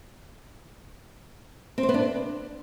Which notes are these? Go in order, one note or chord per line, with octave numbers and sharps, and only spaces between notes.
C4
C5
B3
D4